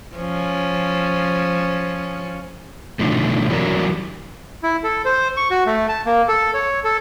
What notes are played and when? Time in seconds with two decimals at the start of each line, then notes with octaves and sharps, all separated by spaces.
0.16 F3 C#4
2.99 B2 D3 D#3 F3 A3
3.49 E3 F#3 G3 F#4 A#4
4.63 E4
4.84 A4
5.05 C5
5.37 C#6
5.50 F#4
5.66 A3
5.89 A5
6.06 A#3
6.28 A4
6.54 C#5
6.84 A4